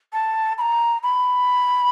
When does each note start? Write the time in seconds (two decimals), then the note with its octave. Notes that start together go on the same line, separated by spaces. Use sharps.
0.13 A5
0.58 B5
0.61 A#5
1.03 B5